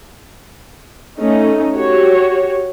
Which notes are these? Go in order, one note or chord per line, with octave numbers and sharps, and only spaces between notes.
A3 C#4 D#4
F#4 G4 C#5